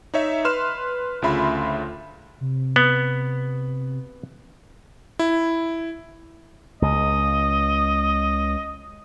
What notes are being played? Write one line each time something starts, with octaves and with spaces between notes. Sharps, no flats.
D#4 C#5 E5
B4 C6 F6 E7
D2 C#3 F4 E5 B5 C6
C3
B3
E4
C#2 D#5